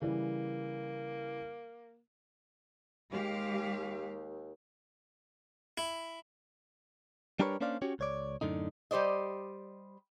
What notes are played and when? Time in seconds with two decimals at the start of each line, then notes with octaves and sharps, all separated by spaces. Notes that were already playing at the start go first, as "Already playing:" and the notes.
0.02 C#3 E3 G3 A#3
3.12 D#2 G#3 G4 F5
5.78 E4
7.40 G3 D4 G4 A#4 B4 C#5
7.61 A#3 C#4 D4 C5 D5 F5
7.82 C#4 F#4 G4 C#5
7.99 C#2 C#5 D5
8.41 F#2 A2 D3 D#4
8.91 G3 G4 C5 D5 D#5